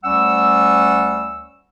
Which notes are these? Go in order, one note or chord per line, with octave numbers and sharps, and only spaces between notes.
D2 G3 C#4 F#5 E6